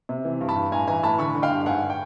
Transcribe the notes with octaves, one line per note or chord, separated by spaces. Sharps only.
C3
E3
G2
A5 B5
G2
A2 G#5 A#5
E3 G#5 A#5
A2 A5 B5
D3 B5 C#6
D3
F5 G5
G2
G#2 F#5 G#5
G5